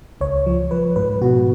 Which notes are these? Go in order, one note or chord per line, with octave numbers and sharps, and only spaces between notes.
C#2 C#5
F3
F3 B4
G#2 B4
B2 F#4